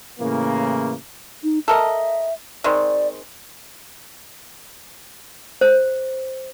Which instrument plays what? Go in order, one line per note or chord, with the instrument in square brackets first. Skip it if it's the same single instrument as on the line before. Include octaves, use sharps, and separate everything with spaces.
[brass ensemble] A2 C#3 E3 A#3
[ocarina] D#4
[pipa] A4 A#4 D#5 [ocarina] E5
[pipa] D#3 G#3 C4 [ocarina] D5
[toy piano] C5